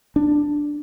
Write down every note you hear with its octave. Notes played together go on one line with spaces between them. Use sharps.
D4